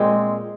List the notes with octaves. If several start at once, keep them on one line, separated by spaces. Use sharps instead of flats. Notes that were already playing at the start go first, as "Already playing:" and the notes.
Already playing: A#2 G#3 C4